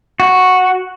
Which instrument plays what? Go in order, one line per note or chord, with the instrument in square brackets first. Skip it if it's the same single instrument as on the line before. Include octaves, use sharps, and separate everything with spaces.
[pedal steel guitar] F#4